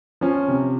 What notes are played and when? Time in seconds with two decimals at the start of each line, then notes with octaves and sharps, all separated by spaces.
0.21 F3 C#4
0.48 C3